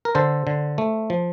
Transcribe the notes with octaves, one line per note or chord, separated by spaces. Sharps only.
A#4
D3 A4 C5
D3
A3
F3